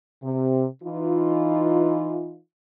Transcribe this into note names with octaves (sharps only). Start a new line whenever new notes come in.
C3
E3 D#4 F4